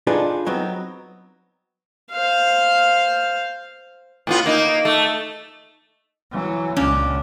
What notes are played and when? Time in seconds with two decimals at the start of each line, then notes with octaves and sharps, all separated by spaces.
0.07 D4 D#4 F4 G#4 A4 B4
0.47 F#3 B3 C4 D#4
2.11 C5 F5
4.27 A2 B3 F4
4.46 A#3 D#4
4.85 A3
6.31 E3 F#3
6.76 C#2 A#2 C#4 D4